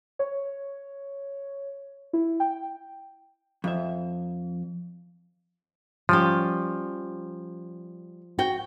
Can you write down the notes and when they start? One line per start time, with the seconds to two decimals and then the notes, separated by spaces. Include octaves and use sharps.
0.19 C#5
2.13 E4
2.40 G5
3.64 F2 E5
6.09 F3 G3 C#4 G4
8.39 F#4 G5